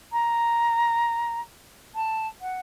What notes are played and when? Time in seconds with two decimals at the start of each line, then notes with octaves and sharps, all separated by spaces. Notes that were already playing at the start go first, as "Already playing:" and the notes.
0.12 A#5
1.95 A5
2.41 F#5